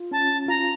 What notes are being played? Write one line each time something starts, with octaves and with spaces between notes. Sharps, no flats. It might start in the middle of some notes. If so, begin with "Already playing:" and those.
Already playing: F4
C#4 A5
F4 A#5